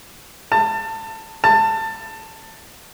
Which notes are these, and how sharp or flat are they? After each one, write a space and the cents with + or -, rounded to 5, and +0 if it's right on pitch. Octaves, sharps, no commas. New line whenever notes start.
A5 +25
A5 +20